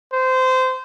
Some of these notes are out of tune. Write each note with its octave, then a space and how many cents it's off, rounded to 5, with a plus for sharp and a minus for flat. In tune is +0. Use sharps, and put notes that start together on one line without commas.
C5 -20